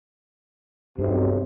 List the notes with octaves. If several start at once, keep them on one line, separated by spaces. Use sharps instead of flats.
B1 G2 C3